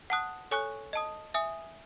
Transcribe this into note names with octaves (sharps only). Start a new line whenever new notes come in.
F#5 A5 D#6 F#6
A4 C#5 G#5 C#6 F#6
D#5 A5 D#6
E5 G#5 D#6